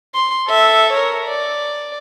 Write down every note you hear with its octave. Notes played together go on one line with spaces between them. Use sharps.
C6
A4 E5
A#4 C#5
D5